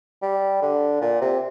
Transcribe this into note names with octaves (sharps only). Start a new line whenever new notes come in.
G3
D3
A#2
C3